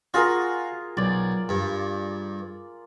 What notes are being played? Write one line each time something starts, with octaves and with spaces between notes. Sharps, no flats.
F4 F#4 G#4 A#4
B1 D5
G2